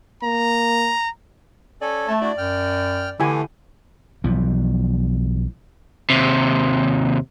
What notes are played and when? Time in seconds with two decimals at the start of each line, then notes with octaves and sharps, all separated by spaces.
0.23 A#3 A#5
1.81 C#4 A4 D5 G#5
2.08 A3 A5
2.21 D4 E4 F#4 D5
2.38 F#2 G5 F6
3.20 D3 E3 A3 E4 G4 G#5
4.24 B1 E3 F3
6.10 D#2 C3